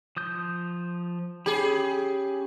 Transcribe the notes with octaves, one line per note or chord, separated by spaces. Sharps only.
F3 D#6 G6
C#4 G4 G#4 B5